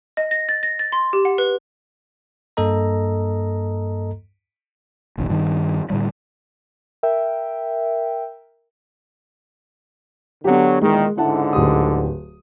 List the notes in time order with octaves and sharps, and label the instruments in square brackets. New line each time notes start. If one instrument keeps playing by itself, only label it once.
[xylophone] D#5
A#6
A6
A#6
A6
C6
G4
F#5
B4
[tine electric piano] G2 A#3 A4 D#5 A#5
[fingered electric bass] F#1 B1 E3
G2 D#3
A2 D3 G3
[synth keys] A#4 E5 G5
[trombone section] D3 F#3 [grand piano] B3 G4
[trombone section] E2 A#2 D#3 [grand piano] G#3
[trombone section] C#2 G#2 D3 [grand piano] E4 F#5 A5
[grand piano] D1 G4 D#6